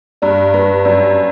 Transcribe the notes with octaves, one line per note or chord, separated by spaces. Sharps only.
G2 D5
G2 B4
F#2 D5